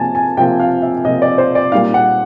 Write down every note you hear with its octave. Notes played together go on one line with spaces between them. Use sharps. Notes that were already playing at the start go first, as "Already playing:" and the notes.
Already playing: C3 F3 A#3 G#5 A5
G#5
C3 F3 A#3 G5
F5
E5
C3 F3 A#3 D#5
D5
C5
D5
A#2 G3 A#3 D#4 F5
F#5